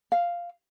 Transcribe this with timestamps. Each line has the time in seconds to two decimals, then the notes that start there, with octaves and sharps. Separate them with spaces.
0.12 F5